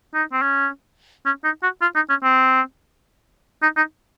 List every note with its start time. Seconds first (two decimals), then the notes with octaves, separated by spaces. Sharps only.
0.14 D#4
0.32 C4
0.42 C#4
1.26 C#4
1.44 D#4
1.63 F#4
1.82 F4
1.95 D#4
2.09 C#4
2.23 C4
3.62 D#4
3.77 D#4